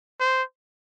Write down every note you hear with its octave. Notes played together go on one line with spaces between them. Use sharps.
C5